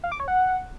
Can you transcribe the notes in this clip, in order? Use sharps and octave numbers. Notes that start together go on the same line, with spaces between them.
F5
D6
C#5
F#5